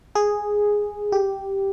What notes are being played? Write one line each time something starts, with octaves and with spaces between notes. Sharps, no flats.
G#4
G4